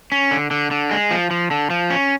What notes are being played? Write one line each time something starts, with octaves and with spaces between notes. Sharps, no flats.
C#4
D3
D3
D3
G#3
F3
F3
D3
F3
C#4